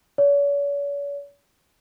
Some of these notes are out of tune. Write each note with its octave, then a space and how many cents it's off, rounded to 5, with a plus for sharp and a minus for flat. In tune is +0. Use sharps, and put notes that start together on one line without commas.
C#5 +45